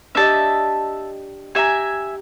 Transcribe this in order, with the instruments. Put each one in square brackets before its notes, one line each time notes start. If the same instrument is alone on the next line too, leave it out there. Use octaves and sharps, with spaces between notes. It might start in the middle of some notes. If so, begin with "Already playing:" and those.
[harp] D4 G4 D#5 [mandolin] E5 A5
[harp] G4 A#5 [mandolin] E5 G#5